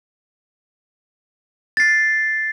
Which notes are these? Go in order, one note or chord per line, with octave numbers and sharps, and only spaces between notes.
A6 C7